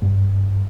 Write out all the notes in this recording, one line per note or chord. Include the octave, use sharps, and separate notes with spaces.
G2